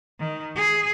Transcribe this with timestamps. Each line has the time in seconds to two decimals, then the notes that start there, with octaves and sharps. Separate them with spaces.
0.20 D#3
0.56 G#4